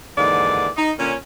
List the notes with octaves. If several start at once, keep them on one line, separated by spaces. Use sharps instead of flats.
D#2 G#2 D3 E3 D5
D#4
A#2 D3 C#4